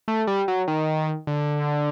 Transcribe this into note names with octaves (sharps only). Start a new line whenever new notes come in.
A3
G3
F#3
D#3
D3